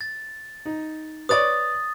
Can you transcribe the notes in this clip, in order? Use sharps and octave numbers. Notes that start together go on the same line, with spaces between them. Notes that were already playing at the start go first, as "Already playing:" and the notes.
A6
D#4
B4 C#5 D5 D#6 A6